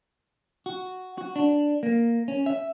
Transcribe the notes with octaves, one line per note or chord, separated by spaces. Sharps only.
F#4
F#4
D4
A#3
C#4
E5